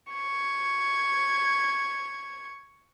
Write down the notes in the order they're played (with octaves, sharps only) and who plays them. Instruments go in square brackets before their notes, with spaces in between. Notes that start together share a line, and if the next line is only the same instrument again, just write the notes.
[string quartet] C#6 G#6